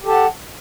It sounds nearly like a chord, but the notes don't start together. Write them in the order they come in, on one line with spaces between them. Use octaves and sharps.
G4 A4 A5 F#5